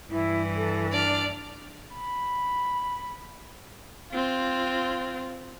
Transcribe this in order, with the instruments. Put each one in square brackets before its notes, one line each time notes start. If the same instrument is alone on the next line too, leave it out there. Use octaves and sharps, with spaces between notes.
[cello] G2 E3 [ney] E4
[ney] A4
[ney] D4 [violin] D5 F6
[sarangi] B5
[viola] C4 F4